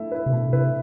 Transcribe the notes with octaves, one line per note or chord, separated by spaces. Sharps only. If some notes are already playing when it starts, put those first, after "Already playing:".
Already playing: A3 E4
E4 B4
C3
B2 A3
C3 E4 B4